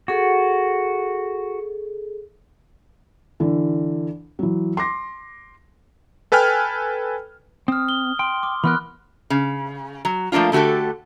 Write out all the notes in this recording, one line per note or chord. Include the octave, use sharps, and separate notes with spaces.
F#4 G#4 A4
D3 E3
E3 F#3
C6 D6 A#6
A4 B4 G5 G#5 F6
C4 D#6 F6
G7
G5 C6
D6
E3 B3 A#4 B5 F6 F#6
C#3
F#3
F3 A3 A#3 D4 F4
D3 A3 F#4 G4 A4